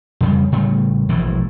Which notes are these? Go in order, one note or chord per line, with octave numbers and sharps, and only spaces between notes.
F2 C#3 G3
A2 C#3 G3 A3
E1 A#1 A2 E3